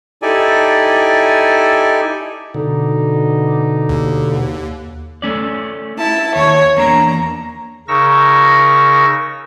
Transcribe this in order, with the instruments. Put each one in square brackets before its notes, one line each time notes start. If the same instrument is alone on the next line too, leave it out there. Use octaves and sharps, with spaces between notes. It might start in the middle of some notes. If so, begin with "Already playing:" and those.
[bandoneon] D#4 E4 G4 A4 D5 G#5
[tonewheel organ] B2 D3 [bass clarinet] D#4
[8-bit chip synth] D#2
[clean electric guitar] A3 C#4 D5
[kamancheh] E4 A5
[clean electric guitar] D#2 [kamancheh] C#5
[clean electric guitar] E2 A#3 D4 [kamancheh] A#5
[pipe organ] C#3 D#4 A#4 C#6 E6 A#6